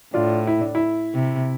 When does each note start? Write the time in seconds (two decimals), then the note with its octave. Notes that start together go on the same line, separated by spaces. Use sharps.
0.14 A2 D4 F4
0.47 E4
0.61 D4
0.75 E4
1.15 C3